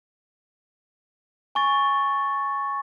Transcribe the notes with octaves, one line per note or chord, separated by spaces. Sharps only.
G#5 C#6 A6